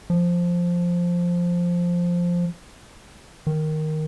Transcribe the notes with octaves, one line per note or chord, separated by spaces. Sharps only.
F3
D#3